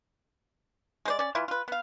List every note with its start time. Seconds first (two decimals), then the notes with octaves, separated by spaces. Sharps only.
1.05 G#3 C5 D5
1.19 C#4 D5
1.35 E3 E4 F4
1.48 F4 B4
1.68 B3 F5